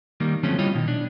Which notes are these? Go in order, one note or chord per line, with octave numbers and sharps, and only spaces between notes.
D#3 G3 A#3
D3 F3 F#3 A3 C4 C#4
G3 E4 F4 C#5 D#5
B2 D#3
D4